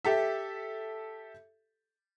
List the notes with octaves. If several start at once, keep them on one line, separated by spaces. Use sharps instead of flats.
G4 A4 E5